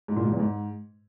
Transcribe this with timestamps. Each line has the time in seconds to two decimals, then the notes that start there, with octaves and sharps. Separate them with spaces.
0.08 G#2
0.16 A#2
0.24 G#2
0.32 E2
0.39 G#2